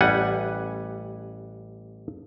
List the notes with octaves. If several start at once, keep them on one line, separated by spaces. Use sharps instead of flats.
A1 G3 F#5 G#5